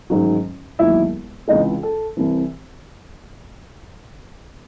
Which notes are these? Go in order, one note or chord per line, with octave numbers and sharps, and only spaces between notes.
A1 G#2 D#3 F#3
E1 D#2 D#3 F#3 E4 E5
C#2 C3 E3 G#3 D#4 D#5
A4
C2 C3 E3